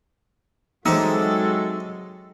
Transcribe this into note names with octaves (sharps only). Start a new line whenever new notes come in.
F#3 G#3 C4 D#4 G4 A4 E5